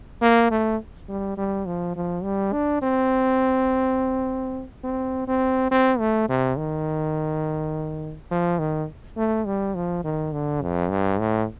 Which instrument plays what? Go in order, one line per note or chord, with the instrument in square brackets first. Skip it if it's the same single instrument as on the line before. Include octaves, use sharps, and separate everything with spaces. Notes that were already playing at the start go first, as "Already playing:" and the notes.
[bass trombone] A#3
A3
G3
G3
F3
F3
G3
D4
C4
C4
C4
C4
A3
C3
D#3
F3
D#3
A3
G3
F3
D#3
D3
F2
G2
A2